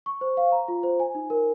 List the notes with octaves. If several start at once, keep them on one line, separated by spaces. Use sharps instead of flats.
C#6
C5
F5
A#5
F4
C5
G#5
D#4
A#4